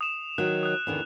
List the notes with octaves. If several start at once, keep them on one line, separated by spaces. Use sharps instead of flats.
D#6 E7
D#3 F#3 F#6
D#6 F#6
E2 D3 D#3